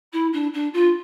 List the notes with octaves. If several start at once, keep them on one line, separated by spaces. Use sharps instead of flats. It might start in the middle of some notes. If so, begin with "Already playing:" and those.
E4
D4
D4
F4